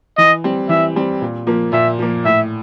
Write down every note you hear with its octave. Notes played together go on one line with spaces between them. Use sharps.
E3 D#5
G3 C4
E3 E5
G3 C4
A#2
F3 A#3
A#2 E5
F3 A#3
A2 E5